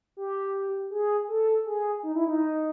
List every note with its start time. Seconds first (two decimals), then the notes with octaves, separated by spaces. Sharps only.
0.17 G4
0.91 G#4
1.29 A4
1.65 G#4
2.03 D#4
2.15 E4
2.28 D#4